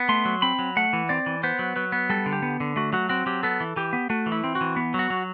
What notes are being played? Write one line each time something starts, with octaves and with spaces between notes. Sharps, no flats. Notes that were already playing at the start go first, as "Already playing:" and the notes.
Already playing: B3
A3 C6
F#3
C4 B5
F#3
A3 F#5
E3
C4 D5
E3
B3 C5
F#3
F#3 B4
B3
G3 A4
D3
G4
B3
D3
A3 F#4
F#3 F#4
C4 F#4
F#3 G4
B3 A4
E3
E3 G4
B3
A3 F#4
E3
E4
C4
F#4
E3
B3
F#3
F#4
F#3